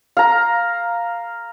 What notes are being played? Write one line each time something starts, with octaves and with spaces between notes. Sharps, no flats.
F5 A#5